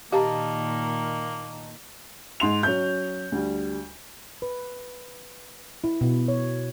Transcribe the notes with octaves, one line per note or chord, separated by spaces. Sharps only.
A#2 D#3 A#3 G4 D#5 F5 A5 A#5
G#2 C6 F7
F#3 C#4 G6
D2 G3
B4
E4
B2
C#5